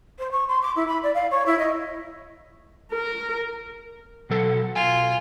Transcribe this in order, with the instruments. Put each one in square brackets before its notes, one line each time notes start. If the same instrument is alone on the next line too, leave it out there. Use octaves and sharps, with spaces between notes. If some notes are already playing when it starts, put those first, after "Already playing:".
[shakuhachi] C5
C#6
C6
D6
E4
B5
D5
F5
C#5
E4
D#5
[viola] A#4
[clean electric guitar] B2 F#3 A4
[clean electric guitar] B1 G#5 [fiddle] F4